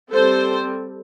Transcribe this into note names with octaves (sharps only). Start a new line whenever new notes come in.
G3 C4 A4 C5